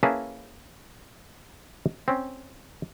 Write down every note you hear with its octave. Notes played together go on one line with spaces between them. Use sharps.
A#3 C#4 E4 G#4 B4 A5
C4 C#4